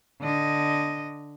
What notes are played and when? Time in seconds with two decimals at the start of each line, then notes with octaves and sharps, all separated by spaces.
0.21 D3 D#5